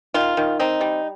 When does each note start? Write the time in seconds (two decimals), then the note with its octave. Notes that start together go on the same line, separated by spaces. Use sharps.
0.14 D#3 F4
0.37 D#3
0.59 C4 D#4
0.81 G3